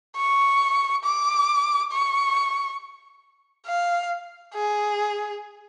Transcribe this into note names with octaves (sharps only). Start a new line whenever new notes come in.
C#6
D6
C#6
F5
G#4